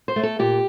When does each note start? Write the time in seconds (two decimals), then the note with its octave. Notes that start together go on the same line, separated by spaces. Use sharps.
0.08 C5
0.16 A3
0.23 A4
0.39 A#2 G4